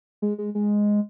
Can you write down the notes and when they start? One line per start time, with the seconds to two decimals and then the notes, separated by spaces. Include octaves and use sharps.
0.22 G#3
0.38 G#3
0.55 G#3